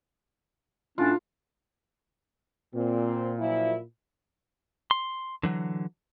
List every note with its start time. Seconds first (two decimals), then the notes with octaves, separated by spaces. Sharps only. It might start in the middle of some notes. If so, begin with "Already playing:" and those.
0.98 A2 C#4 D4 F4
2.74 A#2 C4
3.38 F3 F#3 E4
4.91 C6
5.43 D3 E3 F#3